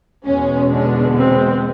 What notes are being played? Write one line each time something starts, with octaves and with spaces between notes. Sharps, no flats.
E2 B2 G#3 C#4
D3 D4
C4